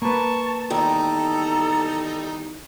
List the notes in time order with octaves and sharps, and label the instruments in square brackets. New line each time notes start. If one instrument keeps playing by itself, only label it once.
[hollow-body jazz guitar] A#3 B4 [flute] A5 [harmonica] C#6
[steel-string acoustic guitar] E2 D#3 [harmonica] G3 D#4 A#5 [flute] A4